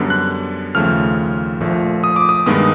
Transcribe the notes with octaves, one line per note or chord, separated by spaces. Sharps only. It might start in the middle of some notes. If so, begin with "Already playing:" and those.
Already playing: F#2 D3 G3 B3
F#6
D#2 C#3 F3 A3 F6
A#1 A#2 F3 A3
D#6
D6
D#6
G2 D#3 G#3 B3 D#6